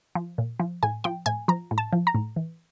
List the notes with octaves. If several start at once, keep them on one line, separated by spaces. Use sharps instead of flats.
F3
A#2
F3
A2 G#5
F3 G5
A2 G#5
F3 A#5
A2
A5
F3
A#5
A2
E3